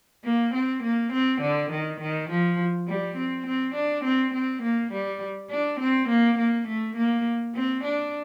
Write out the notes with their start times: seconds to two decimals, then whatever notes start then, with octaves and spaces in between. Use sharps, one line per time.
0.24 A#3
0.54 C4
0.83 A#3
1.13 C4
1.41 D3
1.71 D#3
2.00 D#3
2.30 F3
2.88 G3
3.16 C4
3.46 C4
3.75 D4
4.04 C4
4.33 C4
4.62 A#3
4.92 G3
5.50 D4
5.80 C4
6.08 A#3
6.38 A#3
6.68 A3
6.96 A#3
7.55 C4
7.84 D4